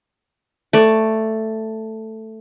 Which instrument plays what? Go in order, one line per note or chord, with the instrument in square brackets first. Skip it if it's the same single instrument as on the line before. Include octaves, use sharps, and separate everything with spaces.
[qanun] A3 D5